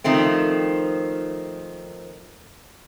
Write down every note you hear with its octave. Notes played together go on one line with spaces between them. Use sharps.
D#3 F3 A3 C4